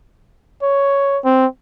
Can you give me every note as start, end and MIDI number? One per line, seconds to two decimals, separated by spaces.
0.63 1.19 73
1.25 1.46 60